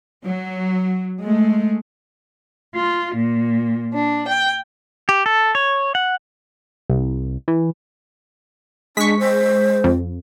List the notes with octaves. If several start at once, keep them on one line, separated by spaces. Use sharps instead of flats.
F#3
G#3 A3
F4
A#2
D4
G5
G4
A4
C#5
F#5
C2
E3
G#3 D4 C#6 B6
C5
F2